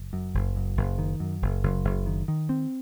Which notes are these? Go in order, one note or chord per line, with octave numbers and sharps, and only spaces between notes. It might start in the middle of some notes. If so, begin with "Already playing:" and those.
Already playing: F#1
F#2
F#1
F#2
F#1
D#3
F#2
F#1
F#1
F#1
D#3
D#3
C4